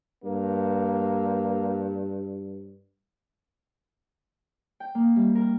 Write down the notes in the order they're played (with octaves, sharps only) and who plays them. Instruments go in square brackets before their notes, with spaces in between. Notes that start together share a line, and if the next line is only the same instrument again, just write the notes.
[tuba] G2 [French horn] A#3
[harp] G5
A#3
G3
A#4